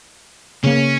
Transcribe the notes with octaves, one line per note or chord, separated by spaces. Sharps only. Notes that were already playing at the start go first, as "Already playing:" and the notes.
C#3 A#3 C#4